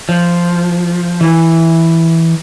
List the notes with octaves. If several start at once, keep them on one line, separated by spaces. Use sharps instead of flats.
F3
E3